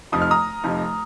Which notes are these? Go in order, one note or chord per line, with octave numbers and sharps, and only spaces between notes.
F1 F2 F3 D#4 D#6
F6
A#5 D#6
F1 F2 F3 D#4